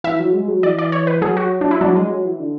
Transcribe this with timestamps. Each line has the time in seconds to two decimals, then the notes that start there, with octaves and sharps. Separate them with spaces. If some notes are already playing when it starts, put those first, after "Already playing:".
0.04 E3 E5
0.19 F#3
0.33 G#3
0.48 F#3
0.63 E3 D5
0.78 D5
0.92 C#5
1.07 B4
1.21 F#3 G#4
1.37 F#4
1.61 D4
1.71 E4
1.81 F#3 D4
1.96 G#3
2.10 F#3
2.25 E3
2.40 D3